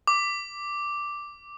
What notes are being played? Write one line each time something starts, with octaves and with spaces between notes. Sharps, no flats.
D6